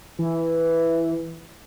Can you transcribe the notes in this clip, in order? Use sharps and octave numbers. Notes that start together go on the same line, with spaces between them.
E3